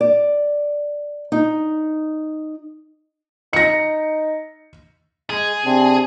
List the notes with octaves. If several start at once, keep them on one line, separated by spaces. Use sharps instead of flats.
D5
D#4
D#4 A#6 C#7
G#3 G#4
C3 C4 D4